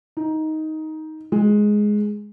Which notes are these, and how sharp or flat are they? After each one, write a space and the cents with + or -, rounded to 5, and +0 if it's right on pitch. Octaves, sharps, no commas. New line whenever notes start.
D#4 +10
G#3 +5